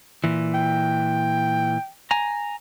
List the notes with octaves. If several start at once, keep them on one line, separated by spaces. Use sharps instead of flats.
A#2 E3
G5
G#5 A#5